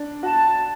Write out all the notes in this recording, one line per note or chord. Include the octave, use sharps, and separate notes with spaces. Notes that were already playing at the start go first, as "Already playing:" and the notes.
Already playing: D4
F#4 A5